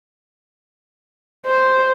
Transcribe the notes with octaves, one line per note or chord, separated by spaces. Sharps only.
C5